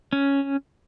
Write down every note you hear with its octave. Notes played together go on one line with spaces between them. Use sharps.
C#4